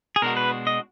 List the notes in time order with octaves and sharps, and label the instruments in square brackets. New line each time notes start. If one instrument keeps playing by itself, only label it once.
[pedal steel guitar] G#4
[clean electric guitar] B2 G#3 D4 F#4 [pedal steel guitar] A#4
[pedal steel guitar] B4
D#5